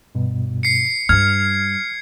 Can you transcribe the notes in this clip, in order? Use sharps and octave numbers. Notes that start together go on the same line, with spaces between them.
G2 B2
C7 C#7
G2 G3 F6 G#6